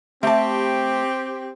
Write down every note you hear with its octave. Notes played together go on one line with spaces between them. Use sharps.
A3 C4 G4 A5